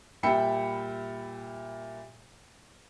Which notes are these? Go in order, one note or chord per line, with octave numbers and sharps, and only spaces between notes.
A#2 G3 E5 G5 B5 C#7